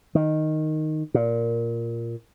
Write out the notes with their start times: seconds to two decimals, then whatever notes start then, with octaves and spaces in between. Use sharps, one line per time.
0.15 D#3
1.14 A#2